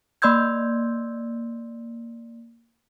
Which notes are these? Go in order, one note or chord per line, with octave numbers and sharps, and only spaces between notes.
A#3 D5 C6 E6 G6 G#6